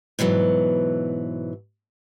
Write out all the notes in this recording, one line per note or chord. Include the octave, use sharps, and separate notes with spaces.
G#2 B2 E3 F#3